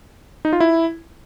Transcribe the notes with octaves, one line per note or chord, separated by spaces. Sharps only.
D#4
F4
E4